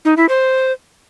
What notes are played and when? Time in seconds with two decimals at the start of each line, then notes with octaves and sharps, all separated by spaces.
0.05 D#4
0.17 E4
0.29 C5